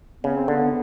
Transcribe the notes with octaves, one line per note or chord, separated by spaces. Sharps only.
C#3 B3
C4
D3 B3